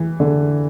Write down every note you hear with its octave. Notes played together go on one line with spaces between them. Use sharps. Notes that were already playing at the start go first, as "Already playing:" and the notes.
Already playing: E3
D3